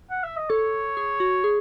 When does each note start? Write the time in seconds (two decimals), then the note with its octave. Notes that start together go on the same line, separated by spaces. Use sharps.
0.10 F#5
0.24 E5
0.37 D#5
0.50 A4 C#5
0.97 G#4
1.20 F#4
1.44 G#4